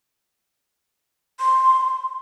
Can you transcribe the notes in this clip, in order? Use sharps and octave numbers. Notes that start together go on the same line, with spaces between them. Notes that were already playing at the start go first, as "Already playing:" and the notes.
C6